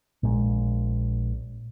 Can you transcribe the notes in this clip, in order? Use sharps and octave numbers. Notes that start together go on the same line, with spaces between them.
A#1 A#2 G#3